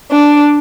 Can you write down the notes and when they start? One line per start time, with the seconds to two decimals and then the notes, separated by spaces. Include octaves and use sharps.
0.11 D4